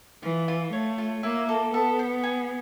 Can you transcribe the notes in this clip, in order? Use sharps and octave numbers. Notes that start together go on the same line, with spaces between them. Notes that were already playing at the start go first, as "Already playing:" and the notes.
E3 F4
F4
A3 C#5
F4
A#3 E4
A4
B3 A4
C5
G#4